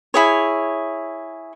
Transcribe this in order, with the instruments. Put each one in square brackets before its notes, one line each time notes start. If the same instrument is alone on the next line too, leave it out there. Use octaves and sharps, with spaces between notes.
[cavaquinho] E4 G#4 C#5